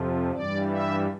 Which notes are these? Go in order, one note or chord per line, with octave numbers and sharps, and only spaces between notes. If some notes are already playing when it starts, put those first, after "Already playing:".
Already playing: F2 C3 F3
G2 E3 G3 D5
E5